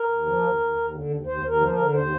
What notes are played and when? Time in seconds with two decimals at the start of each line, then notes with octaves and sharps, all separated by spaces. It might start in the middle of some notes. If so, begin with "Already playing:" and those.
Already playing: A#4
0.09 D#2
0.26 F3
0.43 D#2
0.60 D#2
0.76 D#2
0.93 D3
1.10 D#2
1.26 D#2 C5
1.43 D#2
1.48 A#4
1.61 F3 C5
1.72 A#4
1.77 D3
1.93 D#2 C5